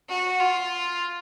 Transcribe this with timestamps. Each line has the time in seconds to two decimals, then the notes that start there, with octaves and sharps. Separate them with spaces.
0.09 F#4
0.39 F4